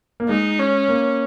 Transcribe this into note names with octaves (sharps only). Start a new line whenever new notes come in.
A#3
G#3 D#4
C#4
A#3